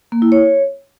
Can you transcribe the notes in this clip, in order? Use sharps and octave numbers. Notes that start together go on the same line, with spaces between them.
A#3
E4
C#5